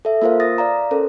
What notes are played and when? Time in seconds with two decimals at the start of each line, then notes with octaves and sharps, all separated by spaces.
0.05 A4 E5
0.22 A#3 F4 A#4 C5 F5
0.40 D#6 A6 A#6
0.58 D5 F5 A#5
0.91 C#4 A4 A#4 C5